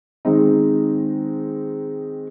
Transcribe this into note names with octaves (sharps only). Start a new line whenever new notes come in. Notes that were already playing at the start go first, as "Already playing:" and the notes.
D#3 G#3 C4 D#4